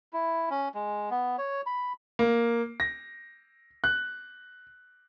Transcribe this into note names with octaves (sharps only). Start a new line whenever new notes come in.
E4
C#4
G#3
B3
C#5
B5
A#3
A#6
F#6